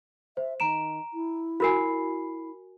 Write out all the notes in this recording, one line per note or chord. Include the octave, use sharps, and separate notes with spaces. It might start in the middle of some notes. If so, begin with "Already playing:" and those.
C5 E5
D#3 A#5 D7 E7
E4
F#4 A#4 G#5 B5 C7